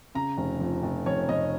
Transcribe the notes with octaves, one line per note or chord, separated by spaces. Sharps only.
C#3 A#5
F1
F2
F1
F1 C#5
F1 D#5